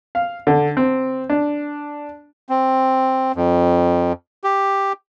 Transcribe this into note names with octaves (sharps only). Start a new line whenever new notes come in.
F5
D3
C4
D4
C4
F2
G4